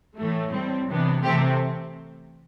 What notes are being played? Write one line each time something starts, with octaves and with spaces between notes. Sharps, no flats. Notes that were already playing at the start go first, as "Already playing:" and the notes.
A2 E3 A3
A2 G3 C4
C3 E3 B3 D4
C3 E3 A3 C4 G4